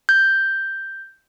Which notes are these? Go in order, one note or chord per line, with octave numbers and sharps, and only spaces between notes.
G6